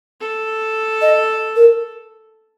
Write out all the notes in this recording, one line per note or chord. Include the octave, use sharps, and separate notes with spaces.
A4
D#5
A#4